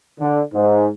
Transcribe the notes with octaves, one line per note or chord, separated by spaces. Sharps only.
D3
G#2